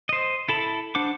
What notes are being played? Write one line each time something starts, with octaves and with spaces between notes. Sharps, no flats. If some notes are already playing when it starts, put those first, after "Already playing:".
C5 D#5
E4 A4 A5 B5
D4 C5 F#5 D6